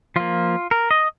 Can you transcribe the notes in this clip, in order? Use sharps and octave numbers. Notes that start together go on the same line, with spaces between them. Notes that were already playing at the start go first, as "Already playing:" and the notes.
F3 A#3 F4
A#4
D#5